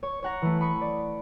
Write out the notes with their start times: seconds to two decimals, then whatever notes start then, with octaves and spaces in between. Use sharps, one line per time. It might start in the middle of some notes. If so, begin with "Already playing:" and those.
0.03 C#5 C#6
0.23 C#5 F#5 A#5
0.42 E3 A3
0.61 B5 C#6 D#6 C#7
0.81 D5